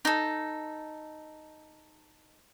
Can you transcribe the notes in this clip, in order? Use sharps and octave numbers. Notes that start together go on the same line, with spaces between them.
D#4 A4